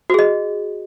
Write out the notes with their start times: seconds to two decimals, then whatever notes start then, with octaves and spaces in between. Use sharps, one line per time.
0.10 F#4
0.14 G#4
0.19 D#5